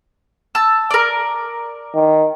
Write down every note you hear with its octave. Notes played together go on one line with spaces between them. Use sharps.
A5 E6
A#4 D5
D#3